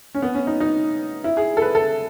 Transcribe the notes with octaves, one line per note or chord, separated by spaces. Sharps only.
C#4
B3
C#4
D#4
D#4
E4
G#4
A4
B4
A4